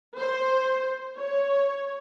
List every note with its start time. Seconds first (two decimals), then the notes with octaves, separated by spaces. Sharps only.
0.18 C5
1.17 C#5